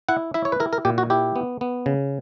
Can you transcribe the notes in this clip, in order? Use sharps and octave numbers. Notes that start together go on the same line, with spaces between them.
E4 F#5
E4 E5
C#5
B4
E4 A#4
A#4
A#2 G4
F#4
E4 G4
B3
B3
C#3